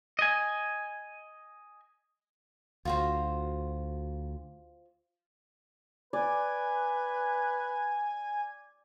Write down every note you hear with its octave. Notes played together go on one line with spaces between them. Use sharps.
D#5 G#5
D2 F4 F#4 C5
B4 D5 G#5